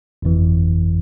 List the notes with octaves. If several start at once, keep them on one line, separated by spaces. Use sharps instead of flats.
G1 F2 E3